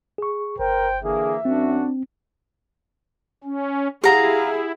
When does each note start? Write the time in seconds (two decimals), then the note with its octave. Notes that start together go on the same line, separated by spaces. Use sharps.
0.18 G#4 C#6
0.59 G1 A#4 C5 G5
1.03 D3 E3 A#3 G#4 E5
1.45 F#2 C4 D4 F#4
3.44 C#4
4.04 E4 G4 G#4 F5 F#5 A#5